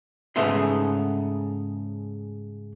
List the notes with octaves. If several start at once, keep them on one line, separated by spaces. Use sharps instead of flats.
G#2 C#3 A3 B3 D#4 C6